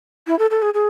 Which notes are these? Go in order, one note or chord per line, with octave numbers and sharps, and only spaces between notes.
E4
A4
A4
G#4
G#4